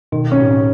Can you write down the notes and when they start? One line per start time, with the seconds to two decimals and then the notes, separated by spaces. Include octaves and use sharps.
0.12 B2 D#3
0.32 C#4
0.40 A2